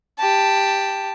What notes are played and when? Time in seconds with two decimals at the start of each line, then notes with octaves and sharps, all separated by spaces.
0.19 G4 A5